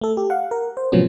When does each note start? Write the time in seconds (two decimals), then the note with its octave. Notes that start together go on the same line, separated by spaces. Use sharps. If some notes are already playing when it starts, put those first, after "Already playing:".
0.01 A3 A4
0.17 G4
0.30 F5 F#5
0.51 A#4
0.77 C5
0.92 A2 C3 F3 F#3 B3 C#4